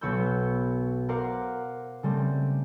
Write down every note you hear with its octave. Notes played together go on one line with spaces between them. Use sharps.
B1 B3 C#5 B5 E6 G6
A#4 C5 F5 F#5 A#5 D6
C#3 G3 A3 C4